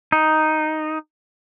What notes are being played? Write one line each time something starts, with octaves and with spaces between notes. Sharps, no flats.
D#4